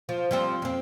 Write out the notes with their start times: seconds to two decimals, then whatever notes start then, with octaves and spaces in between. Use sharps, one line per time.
0.09 F3
0.31 F3 G3 C4
0.62 F2 C4